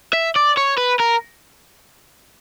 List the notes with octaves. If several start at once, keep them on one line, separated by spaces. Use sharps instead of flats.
E5
D5
C#5
B4
A#4